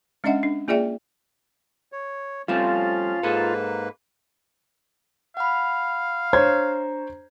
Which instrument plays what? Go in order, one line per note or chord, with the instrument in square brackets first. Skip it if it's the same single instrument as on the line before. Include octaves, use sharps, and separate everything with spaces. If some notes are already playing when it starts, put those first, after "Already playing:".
[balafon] G#3 C#4 D4 D#5 E5 F#5
D4
A#3 F4 G#4 D5 E5 G5
[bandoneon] C#5
[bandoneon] F3 C#4 [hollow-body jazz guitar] G3 A3 C4 [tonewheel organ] F4
[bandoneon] G#2 A#3 B4 [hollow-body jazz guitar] G#4 A4
[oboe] F5 [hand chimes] F#5 B5
[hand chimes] D4 A#5 [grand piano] C5 C#5 G#6